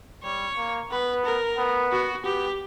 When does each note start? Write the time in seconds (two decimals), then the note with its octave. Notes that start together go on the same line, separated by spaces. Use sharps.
0.24 G3 C#5
0.57 A#3
0.91 B3 B4
1.25 A#4
1.58 B3
1.92 F#4
2.24 B3 G4